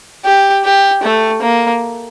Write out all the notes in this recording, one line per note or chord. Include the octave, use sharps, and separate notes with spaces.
G4
G4
A3
A#3